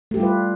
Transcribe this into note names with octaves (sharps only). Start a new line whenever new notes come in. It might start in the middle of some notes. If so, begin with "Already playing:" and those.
G3 A3 F4 G4 B4